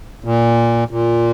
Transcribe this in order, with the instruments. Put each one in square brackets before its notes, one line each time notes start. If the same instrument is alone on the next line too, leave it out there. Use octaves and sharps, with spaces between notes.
[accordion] A#2
A#2